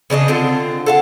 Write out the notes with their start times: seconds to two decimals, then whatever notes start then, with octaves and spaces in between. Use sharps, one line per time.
0.10 C#3 D4 A4 D#5
0.28 D3 C4 F4
0.86 A4 F5 F#5